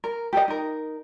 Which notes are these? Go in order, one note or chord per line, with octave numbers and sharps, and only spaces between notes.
A#4
G4 A4 A#4 D#5
D#4 A#4